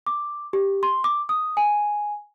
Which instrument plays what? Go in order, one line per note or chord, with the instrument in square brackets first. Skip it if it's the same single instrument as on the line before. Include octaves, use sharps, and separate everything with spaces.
[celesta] D6
G4
C6
D6
D#6
G#5